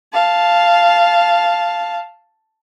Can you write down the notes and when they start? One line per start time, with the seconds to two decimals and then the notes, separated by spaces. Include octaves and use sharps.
0.13 F5 A5